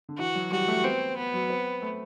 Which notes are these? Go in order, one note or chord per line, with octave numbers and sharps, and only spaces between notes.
D3
E3 F#4
F#3
G3 F#4
A3
B3 C4
B3
F#3
C4
A3